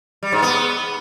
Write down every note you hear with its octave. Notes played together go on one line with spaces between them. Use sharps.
G3
G#2
B3